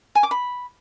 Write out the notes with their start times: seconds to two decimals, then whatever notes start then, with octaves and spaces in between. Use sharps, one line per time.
0.15 G#5
0.23 D6
0.31 B5